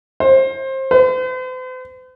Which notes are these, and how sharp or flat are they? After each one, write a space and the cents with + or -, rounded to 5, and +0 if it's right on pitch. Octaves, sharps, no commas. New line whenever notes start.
C5 +25
C5 -45